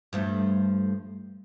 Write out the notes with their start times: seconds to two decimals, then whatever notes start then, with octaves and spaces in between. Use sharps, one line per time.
0.13 G2 F3 A3